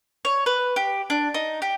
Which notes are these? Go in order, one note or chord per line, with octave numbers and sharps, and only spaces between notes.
C#5
B4
G4
D4
D#4
G4